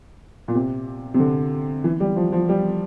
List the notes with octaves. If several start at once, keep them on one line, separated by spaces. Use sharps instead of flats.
A#2
C3
C3
D3
E3
G3
F3
F3
G3